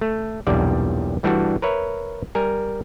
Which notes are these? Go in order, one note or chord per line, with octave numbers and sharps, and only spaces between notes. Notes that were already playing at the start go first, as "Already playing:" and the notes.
A3
B1 E2 G2 A#2 G3 D5
G2 E3 G3 A3 D4 F#4
A#4 B4 C#5 E5
G3 A#4 G#5